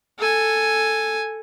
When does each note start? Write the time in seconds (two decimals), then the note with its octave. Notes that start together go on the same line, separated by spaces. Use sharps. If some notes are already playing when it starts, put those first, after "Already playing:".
0.18 A4 G#5